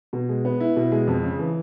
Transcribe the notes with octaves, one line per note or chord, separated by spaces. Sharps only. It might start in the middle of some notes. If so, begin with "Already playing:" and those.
B2
G#3
B3
E4
B2
G#3
F2
C#3
E3